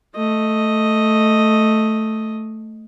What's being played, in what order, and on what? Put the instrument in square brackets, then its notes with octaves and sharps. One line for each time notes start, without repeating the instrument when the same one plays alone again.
[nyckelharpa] A3 D#5